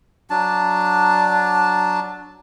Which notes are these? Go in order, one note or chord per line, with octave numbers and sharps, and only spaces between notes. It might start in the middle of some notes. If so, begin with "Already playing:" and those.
F#3 D4 A5